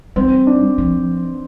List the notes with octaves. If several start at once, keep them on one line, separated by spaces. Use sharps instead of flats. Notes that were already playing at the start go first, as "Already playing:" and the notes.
G3 C4
D4
F3